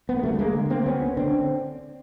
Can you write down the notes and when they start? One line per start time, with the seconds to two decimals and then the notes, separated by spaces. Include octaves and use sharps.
0.09 B3
0.17 A#3
0.23 D2 G3 A3
0.34 A3
0.39 G#3 A#3
0.55 D3
0.70 A#3 C4
0.86 D2 B3 C#4
1.17 D3 C4 D4